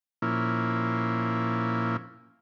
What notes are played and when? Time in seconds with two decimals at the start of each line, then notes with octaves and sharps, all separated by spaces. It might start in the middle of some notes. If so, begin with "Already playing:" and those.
0.22 A#2 F3 A#3 C#4 E4